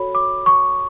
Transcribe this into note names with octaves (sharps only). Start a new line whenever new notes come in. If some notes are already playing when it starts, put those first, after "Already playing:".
Already playing: F#4 A4 C#5 B5
D6
C#6